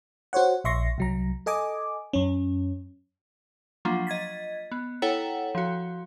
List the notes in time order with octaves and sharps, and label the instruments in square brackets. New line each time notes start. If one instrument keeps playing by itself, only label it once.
[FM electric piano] F#4 C5 C#5 F#5
A#1 E5 C6 C#6 A#6
C2 F#3 A#5
A4 D#5 G#5 D6
F#2 C#4
[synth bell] F3 F#3 A#3 D4 F4
D#5 G#6 A6 B6
B3
E4 A4 C#5 F#5 G5 A#5
F3 F#4